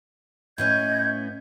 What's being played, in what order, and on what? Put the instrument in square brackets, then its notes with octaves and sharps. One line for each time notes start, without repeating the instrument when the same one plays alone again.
[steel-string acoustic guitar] A2 B3 C#4 [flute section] D#5 G6 G#6